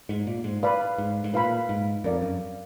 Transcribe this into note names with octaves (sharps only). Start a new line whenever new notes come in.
G#2
A#2
G#2
B4 D5 F5 B5
G#2
G#2
A#2 B4 F5 B5
G#2
F2 A#4 D5 F5
F#2